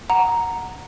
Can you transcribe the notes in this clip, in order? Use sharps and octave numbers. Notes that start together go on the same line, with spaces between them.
F#5 A#5